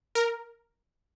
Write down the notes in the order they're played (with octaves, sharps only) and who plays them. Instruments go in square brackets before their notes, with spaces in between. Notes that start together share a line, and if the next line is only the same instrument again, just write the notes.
[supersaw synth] A#4